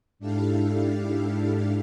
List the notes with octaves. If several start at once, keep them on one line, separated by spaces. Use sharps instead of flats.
G#2 D4 E4 G4 A4 F5